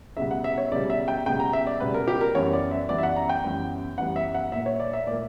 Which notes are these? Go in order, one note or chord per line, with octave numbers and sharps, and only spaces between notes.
C#2 B2 G3 B3 E5
F#5
E5
C#5
C#2 B2 G3 B3 D5
E5
G5
C#2 B2 G3 B3 G5
A#5
E5
D5
C#2 B2 G3 B3 B4
A#4
G4
A#4
F#2 E3 G3 B3 C#5
D5
E5
F#2 E3 G3 B3 D5
E5
F#5
A#5
G5
F#2 E3 G3 B3
F#2 E3 G3 B3 F#5
E5
F#5
A#2 A#3 E5
C#5
D5
E5
A#2 A#3 D5